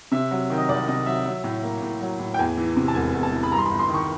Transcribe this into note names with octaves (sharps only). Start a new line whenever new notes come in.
C3 E5
F#3
D#3
D#5
C2 D5
C3 D#5
F#3 E5
F#3
A2
A#3
A2
F#3
A2
G5
E2 G#5
E3
C3
A5
E1 G#5
E2
A5
E3
B5
G2 A#5
C6
B5
G1
C6
D#3
C#6